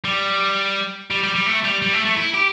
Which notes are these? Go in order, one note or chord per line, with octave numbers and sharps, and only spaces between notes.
G3
G3
G3
G3
A3
G3
G3
A3
A3
E4
G4